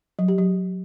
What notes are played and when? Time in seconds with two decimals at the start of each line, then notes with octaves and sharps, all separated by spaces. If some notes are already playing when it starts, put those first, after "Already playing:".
0.19 F#3
0.28 G4
0.38 F#3